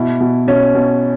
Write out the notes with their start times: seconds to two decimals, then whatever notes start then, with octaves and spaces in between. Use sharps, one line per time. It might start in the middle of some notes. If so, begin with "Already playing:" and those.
Already playing: B2 E4
0.20 B2
0.47 B2 C#4
0.75 B2